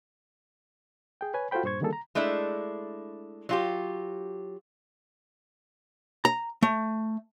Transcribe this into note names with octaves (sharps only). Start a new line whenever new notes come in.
G#4 G5
B4 C#5 G#5
F4 F#4 A4 C5 G5 B5
G2 A#2 C5 C#6 G#6
D3 D#3 G3 A#3 G#4 A4
A#5
G#3 A3 D4 E4
F#3 F4 G4
A#5
A3